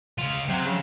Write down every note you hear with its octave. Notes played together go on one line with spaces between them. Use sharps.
C#3 F4
C3 F#3
C#3